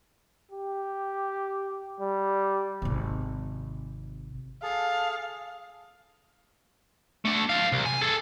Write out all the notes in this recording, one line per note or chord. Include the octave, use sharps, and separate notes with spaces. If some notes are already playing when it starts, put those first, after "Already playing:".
G4
G3
G#1 C3
G#4 A4 F5 A5
A3 D4
A4 F5
C2
G#5
G#4 A4